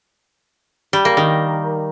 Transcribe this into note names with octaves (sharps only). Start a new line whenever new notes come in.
G3
A#3
D#3